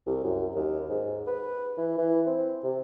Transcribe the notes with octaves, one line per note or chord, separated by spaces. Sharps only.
C2
F#2
D#2
G#2
B4
E3
E3
C4
C3